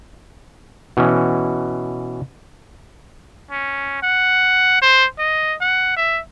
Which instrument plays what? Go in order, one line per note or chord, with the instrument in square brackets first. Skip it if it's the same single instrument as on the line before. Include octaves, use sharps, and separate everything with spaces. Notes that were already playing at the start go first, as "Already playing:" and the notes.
[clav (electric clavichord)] B2 E3 C#4
[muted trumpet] C#4
F#5
C5
D#5
F#5
E5